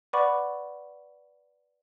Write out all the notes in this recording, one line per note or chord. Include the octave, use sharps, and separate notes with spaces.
B4 D5 F#5 B5 C#6 D6